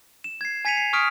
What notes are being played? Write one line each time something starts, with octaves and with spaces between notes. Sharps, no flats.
E7
G#6 C7
G#5 G#6 B6 C#7 D#7 F7
C7
C#6 D#6 F6 B6 D7